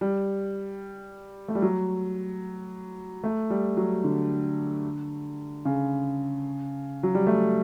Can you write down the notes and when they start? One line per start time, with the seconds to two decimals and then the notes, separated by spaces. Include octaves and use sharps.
0.01 G3
1.48 A3
1.55 G3
1.62 F#3
3.24 A3
3.50 G3
3.77 F#3
4.04 D3
5.65 C#3
7.03 F#3
7.15 G3
7.27 A3